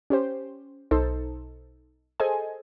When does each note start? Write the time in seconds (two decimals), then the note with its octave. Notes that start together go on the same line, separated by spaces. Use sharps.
0.10 C#4 G4 C5
0.91 B1 D#4 A4 C5
2.20 G#4 A4 C5 D#5 G#5